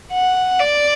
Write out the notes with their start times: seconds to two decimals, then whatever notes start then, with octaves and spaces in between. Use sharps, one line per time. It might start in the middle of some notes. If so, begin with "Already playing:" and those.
0.12 F#5
0.60 D5